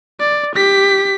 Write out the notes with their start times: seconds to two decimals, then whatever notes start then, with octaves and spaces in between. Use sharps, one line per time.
0.20 D5
0.56 G4 B6